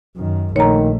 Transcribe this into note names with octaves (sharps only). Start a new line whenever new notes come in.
F#2 D#3
A#1 D#3 A3 C#5 A#5